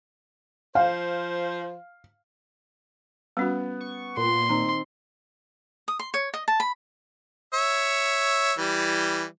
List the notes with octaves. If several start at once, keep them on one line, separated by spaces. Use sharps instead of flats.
F3 C5 F5
G3 B3 C#4 F#4
C#6
A#2 C6
D#3 C4 D#4 A#5
D#6
C6
C#5
D#5
A5
B5
C#5 E5
E3 G3